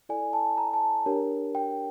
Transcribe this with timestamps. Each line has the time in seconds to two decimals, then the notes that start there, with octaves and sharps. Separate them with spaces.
0.09 E4 A4 D5 G#5
0.33 A5
0.58 A#5
0.74 A5
1.06 D4 G4 A#4 C#5
1.55 G5